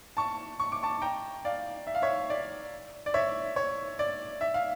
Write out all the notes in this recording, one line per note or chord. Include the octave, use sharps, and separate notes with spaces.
A5 C#6
C#6
D6
A5 C#6
G5 A#5
D5 F5
E5
F5
C#5 E5
D5
D5
C#5 E5
C#5
D5
E5
F5